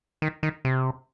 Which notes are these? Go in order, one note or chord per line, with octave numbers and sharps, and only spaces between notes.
D#3
D#3
C3